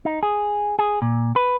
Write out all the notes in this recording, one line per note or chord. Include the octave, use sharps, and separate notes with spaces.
D#4
G#4
G#4
A#2
B4